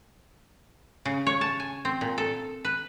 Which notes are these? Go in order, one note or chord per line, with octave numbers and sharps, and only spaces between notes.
C#3
C#5
A5
G#5
C4
A#2
A4
B4